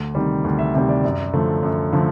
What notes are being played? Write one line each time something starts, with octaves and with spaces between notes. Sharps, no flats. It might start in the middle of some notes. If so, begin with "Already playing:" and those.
Already playing: D2
C3 D#3 G3
D2
E5
C3 D#3 G3 E5
D5
F#2 D5
D3 F3 A3
F#2
D3 F3 A3